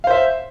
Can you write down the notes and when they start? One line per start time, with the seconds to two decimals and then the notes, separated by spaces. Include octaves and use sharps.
0.04 F5
0.07 C5
0.11 E5